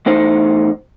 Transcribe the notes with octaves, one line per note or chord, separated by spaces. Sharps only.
E2 A2 D#4 C5